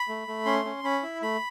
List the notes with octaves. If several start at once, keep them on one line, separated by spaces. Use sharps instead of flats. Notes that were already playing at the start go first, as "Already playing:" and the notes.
Already playing: B5
A3
A3
C#4 C6
C#4
C#4 B5
E4
A3 B5